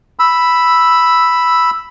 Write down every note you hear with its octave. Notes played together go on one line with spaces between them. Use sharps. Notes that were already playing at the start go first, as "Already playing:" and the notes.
B5 E6